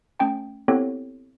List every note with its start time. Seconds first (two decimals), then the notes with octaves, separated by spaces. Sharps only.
0.20 A3 C#4 G5 A5
0.68 B3 C4 E4 G4 A4 C#5